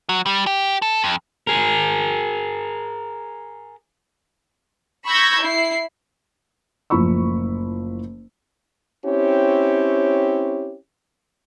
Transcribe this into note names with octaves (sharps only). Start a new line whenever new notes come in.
F#3
G3
G4
A4
F2
G#4 A#4
B5 C#6 E6 G6 G#6 A#6
E4 C7
F#1 A2 F3 B5 C#6 E6
C4 C#4 E4 G4 C#5